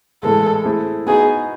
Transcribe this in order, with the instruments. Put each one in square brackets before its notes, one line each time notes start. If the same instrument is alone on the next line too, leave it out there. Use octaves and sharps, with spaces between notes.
[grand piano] A2 E3 G#3 [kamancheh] A4
[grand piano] A3 C4 E4 G#4
[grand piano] B3 D#4 F#4 [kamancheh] G#4